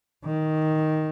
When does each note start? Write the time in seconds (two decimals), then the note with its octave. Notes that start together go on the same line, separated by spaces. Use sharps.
0.24 D#3